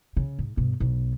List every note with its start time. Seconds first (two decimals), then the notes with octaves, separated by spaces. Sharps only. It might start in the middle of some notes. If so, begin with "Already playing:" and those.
0.17 C#3
0.39 G#2
0.57 G2 B2
0.80 B1